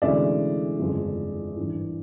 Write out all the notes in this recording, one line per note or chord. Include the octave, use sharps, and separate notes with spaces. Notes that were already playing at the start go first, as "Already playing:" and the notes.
D2 C3 E3 G#3 C#4 D5 E5
G1 F2 C#3 F3 G#3
G#1 G2 E3